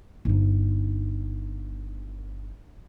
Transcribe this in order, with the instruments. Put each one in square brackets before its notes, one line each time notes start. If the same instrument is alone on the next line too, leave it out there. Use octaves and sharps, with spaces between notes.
[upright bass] G1 D#4